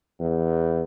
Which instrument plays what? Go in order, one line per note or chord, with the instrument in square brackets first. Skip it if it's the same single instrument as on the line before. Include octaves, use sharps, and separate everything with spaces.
[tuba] E2